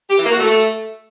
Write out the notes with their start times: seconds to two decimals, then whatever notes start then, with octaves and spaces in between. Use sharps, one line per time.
0.09 G4
0.17 E3
0.25 A#3
0.32 F#4
0.40 A3